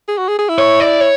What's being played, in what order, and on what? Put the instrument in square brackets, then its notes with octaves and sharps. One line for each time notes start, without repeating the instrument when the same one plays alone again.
[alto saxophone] G#4
F#4
G#4
G#4
E4
[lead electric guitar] C#5
D5
C#5